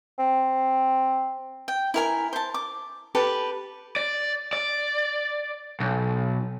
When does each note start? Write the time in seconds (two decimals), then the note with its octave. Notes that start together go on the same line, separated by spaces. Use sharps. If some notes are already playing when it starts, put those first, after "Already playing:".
0.19 C4
1.68 G5
1.94 E4 A#4 G#5
2.33 C5 A5
2.54 D6
3.15 G4 A4 B4 A5
3.96 D5
4.53 D5
5.80 B1